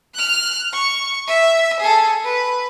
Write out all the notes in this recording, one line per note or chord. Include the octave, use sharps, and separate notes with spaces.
F6 F#6
C#6
E5
G#4 A4
B4